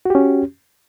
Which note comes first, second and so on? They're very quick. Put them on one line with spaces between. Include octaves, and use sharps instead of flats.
F#4 G4 C#4